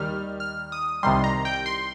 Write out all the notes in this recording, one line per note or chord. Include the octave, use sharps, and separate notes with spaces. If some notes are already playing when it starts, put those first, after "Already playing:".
Already playing: D#2 D#3 G3 F6
F6
D#6
C2 C3 D#3 G3 C6
A#5
G5
C6